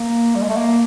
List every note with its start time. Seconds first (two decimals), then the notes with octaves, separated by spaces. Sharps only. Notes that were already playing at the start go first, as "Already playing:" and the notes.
Already playing: A#3
0.35 G3
0.42 G#3
0.49 A3
0.56 A#3